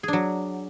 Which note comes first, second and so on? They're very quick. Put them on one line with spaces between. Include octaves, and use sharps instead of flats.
G#4 D4 F#3